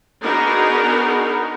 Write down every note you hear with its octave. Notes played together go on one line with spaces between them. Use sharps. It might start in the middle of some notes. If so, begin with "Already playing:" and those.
B3 D4 D#4 F#4 G#4 A#4